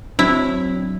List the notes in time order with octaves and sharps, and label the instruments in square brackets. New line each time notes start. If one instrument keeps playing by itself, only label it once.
[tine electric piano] F#3 C4 D4 [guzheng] E4